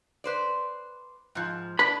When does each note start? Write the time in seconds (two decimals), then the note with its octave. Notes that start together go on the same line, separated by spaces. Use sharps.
0.24 B4 C5 D5
1.35 G#2 F3
1.79 D4 B4 B5